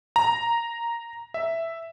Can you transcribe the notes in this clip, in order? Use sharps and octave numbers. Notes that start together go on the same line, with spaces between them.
A#5
E5